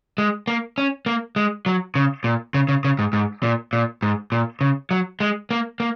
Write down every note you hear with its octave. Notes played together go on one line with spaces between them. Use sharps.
G#3
A#3
C#4
A#3
G#3
F#3
C#3
A#2
C#3
C#3
C#3
G#2
G#2
A#2
A#2
G#2
A#2
C#3
F#3
G#3
A#3
A#3